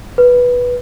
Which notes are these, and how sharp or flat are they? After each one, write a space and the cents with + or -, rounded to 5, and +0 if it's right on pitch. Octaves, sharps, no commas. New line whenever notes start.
B4 -10